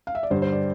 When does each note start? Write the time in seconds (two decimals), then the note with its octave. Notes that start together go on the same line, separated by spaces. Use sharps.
0.07 F5
0.15 E5
0.23 D5
0.30 G2 D3 G3 C5
0.42 C5
0.52 D5